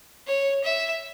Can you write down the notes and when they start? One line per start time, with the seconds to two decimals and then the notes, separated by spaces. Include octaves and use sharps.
0.27 C#5
0.64 E5